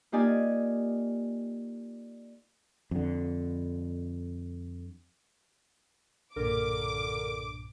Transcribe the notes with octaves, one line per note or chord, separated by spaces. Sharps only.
A#3 D#4 F4 G4 D5 G#5
F2 D3
B1 G2 A#2 D3 A#4 D6